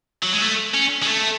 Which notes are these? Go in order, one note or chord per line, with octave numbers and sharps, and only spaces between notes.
F#3
G#3
A3
C#4
G#3
A3